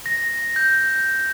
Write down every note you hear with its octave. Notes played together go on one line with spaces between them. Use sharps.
A#6
G6